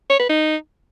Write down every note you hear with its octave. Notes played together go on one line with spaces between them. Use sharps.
C#5
B4
D#4